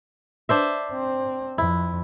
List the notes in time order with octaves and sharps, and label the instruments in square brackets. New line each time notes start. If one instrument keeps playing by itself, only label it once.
[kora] D4 C5 E5
[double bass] C4
[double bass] F2 [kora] E4